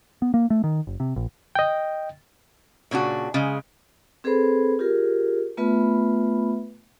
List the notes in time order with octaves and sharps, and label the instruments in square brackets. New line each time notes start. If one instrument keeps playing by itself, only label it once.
[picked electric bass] B3
A#3
A3
D#3
F#1
C3
A#1
[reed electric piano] D#5 G5
[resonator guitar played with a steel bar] A#2 C#3 D4 F#4
C#3 G#3
[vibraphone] C4 G#4 A4 B4 C5 B5
F4 G4 G#4 A#4
A3 B3 F4 B4 E5 B5